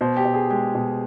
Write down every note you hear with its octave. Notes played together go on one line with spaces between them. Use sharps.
B2 C5
G4
B2
G#4
G#3 G4
B2